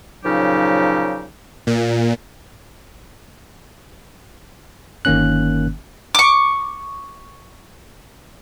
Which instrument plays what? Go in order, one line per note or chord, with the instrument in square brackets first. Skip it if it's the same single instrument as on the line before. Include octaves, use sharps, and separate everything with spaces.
[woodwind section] A#2 C#3 F3 F#3 D#4 G4
[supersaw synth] A#2
[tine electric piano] G1 D#3 A#3 C#4 F#6
[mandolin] C#6 D6